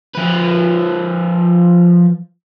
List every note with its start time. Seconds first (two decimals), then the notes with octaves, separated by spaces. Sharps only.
0.15 F3 B4